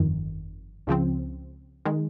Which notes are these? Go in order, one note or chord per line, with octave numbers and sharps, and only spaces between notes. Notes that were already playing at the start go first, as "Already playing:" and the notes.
Already playing: G1 F2 D#3
C#2 C#3 F3 C4
D#3 G#3